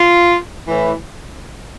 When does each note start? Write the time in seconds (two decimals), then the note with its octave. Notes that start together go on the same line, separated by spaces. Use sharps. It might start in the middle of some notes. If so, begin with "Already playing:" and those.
Already playing: F4
0.66 A2 E3